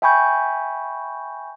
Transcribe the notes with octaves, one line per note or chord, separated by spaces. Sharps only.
E5 G5 G#5 B5 C#6 G6